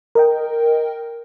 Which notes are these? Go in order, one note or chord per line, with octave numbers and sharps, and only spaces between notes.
A#4 D#5 G5